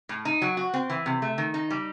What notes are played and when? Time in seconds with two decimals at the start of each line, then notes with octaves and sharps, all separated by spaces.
0.09 A2
0.25 D#4
0.42 F#3
0.57 F#4
0.74 C4
0.90 E3
1.06 C3
1.22 A3
1.38 D#3
1.54 D#4
1.70 G3